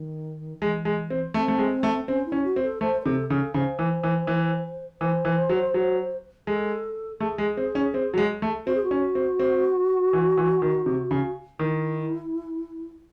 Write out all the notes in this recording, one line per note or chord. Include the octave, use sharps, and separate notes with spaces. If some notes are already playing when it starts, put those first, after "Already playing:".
Already playing: D#3
E3 G#3
G#3
C4
A3 C4
A3
G#3
A3
C4 C#4
E4
C#4
F#4
C4
A4
A3 C5
C5
C3 A4
C#3 A4
C#3 C5
E3
E3
E3
E3 C5
E3
F#3
F#3
G#3 A4
A3 G#4
G#3
C4
C#4
C4
F#3
G#3
A3
C4 F#4
G#4
F#4
C#4
C4
C4
E3
E3
D#3
C3
C#3
D#3 E4